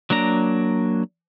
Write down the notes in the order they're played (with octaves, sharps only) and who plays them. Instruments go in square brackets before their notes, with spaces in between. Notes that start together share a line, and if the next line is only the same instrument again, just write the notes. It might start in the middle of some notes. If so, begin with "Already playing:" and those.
[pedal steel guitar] F#3 A#3 D4 A#5